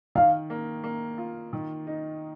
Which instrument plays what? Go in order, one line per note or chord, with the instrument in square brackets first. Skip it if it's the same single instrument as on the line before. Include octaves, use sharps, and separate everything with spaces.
[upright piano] D#3 [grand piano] F5
[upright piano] A#3
A#3
F4
D#3
D#4